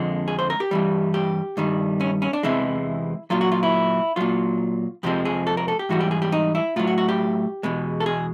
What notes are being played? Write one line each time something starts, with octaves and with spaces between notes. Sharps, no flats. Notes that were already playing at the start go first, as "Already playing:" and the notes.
Already playing: F2 D3 F3 G#3
G#4
C5
A#4
G4
G2 E3 G3
G4
G2 D#3 G3
C#4
C#4
D4
E2 C3 E3 G#3 E4
A#2 F#3 F4
F#4
F4
E4
A#2 F#3 F4
F2 C3 F3 G#3 G4
G#4
A4
A#4
A4
G4
G#2 E3 G3 F#4
G4
G#4
G4
D#4
E4
A2 F#3 F4
F#4
F#4
G4
E2 B2 G#3
A4
G#4